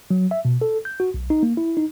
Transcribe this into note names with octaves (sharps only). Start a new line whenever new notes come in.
F#3
E5
B2
A4
G6
F#4
B1
D#4
A#3
E4
D#4